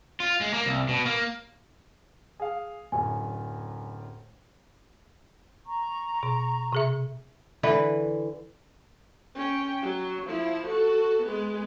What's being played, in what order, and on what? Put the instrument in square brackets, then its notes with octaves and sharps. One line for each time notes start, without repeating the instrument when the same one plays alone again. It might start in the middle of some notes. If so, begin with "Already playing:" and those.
[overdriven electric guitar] F4
G#3
A#3
C2
B2
A#3
[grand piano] G#4 F5
[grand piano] D1 F#2 [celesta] G#5
[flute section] A#5 C#6
[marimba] B2
C3 G#4 E5
[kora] D3 E3 B4
[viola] C#4 G5
F#3
F3 E4
F#4 A4
G#3 B3